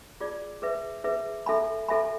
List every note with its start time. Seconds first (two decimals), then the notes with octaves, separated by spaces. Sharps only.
0.20 F4 G#4 D5
0.62 G#4 B4 E5
1.04 G#4 B4 E5
1.46 A4 E5 G#5 B5
1.88 A4 E5 G#5 B5